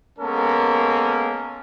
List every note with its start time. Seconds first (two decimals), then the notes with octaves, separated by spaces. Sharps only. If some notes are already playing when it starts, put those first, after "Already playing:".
0.19 G#3 A#3 B3 C#4 A4 A#4